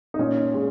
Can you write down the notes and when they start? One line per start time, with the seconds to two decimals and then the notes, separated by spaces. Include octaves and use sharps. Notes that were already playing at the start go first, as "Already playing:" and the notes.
0.14 D#4
0.19 A#2 C#4
0.54 G#3 C#4